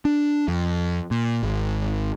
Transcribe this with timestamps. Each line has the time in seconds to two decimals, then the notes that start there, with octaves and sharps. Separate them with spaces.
0.05 D4
0.48 F2
1.11 A#2
1.43 G#1